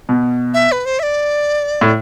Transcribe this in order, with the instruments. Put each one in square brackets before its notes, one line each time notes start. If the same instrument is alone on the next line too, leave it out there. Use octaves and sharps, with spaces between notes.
[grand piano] B2
[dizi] E5
B4
C5
E5
D5
[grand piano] A2